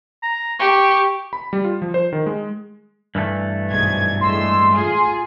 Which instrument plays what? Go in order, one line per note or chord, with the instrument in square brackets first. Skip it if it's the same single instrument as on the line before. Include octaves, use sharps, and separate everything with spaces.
[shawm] A#5
[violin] G4 [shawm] C#6
[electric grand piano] B5
G3
F4
F3
C5
D#3
G#3
[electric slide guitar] G2 E3 A3
[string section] B1 G#2 G#6
[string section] A2 G#3 E6 [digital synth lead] C6
[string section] F4 G#4